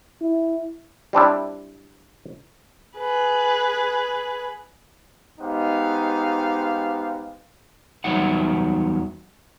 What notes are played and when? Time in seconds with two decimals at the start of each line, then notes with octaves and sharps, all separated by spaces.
0.21 E4
1.13 G3 C4 D4 E4
2.98 G#4 B4
5.39 G#3 B3 D#4 G4 C5 F5
8.04 E2 F#3 G3 D#4 E5 F#5